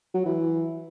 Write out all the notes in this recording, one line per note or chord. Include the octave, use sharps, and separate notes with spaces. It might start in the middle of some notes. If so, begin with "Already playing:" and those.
F#3
E3